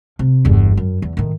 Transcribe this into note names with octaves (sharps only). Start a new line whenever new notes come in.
C3
G1 E2
F#2
E2
A2 D#3